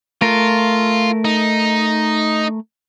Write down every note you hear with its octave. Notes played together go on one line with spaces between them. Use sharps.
A3 F4 A#4
D#4